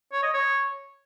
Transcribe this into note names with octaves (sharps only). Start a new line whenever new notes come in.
C#5
D#5
C#5